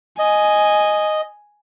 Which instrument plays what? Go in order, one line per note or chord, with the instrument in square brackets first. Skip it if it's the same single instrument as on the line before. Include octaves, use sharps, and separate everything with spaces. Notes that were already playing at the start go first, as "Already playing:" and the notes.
[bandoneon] D#5 [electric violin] G#5